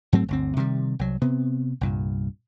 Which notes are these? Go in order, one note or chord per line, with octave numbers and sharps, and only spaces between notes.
G#2 F#3 A3 C4
G1 D2 C4
C3 D#3 F#3 G3
C2 F#3
C3 B3 C4
C2 G2 A#2